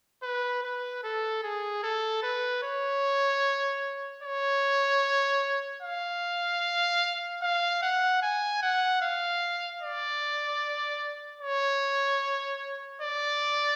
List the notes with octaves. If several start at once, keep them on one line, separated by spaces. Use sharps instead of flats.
B4
B4
A4
G#4
A4
B4
C#5
C#5
F5
F5
F#5
G#5
F#5
F5
D5
C#5
D5